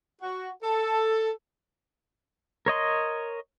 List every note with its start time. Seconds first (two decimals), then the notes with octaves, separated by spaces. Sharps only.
0.22 F#4
0.63 A4
2.66 A#4 C#5 D#5 C6